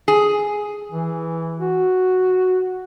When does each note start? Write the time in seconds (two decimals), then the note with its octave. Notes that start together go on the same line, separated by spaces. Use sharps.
0.08 G#4
0.92 E3
1.60 F#4